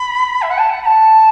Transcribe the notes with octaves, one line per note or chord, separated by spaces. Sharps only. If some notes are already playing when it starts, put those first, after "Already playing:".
Already playing: B5
E5
F#5
A5
F#5
B5
A5